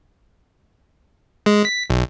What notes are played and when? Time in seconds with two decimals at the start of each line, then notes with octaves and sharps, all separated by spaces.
1.46 G#3
1.65 B6
1.90 B1